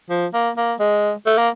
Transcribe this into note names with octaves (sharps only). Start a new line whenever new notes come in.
F3
A#3
A#3
G#3
A3
A#3